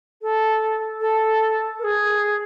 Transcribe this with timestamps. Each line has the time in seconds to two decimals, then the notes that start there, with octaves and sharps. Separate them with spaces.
0.22 A4
1.00 A4
1.79 A#4
1.84 G#4